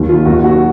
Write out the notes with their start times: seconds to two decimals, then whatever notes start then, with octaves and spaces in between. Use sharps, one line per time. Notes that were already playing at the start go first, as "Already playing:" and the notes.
Already playing: D#2 D#3 F#3
0.09 F4
0.26 D#2 D#3 F#3 F#4
0.44 F#4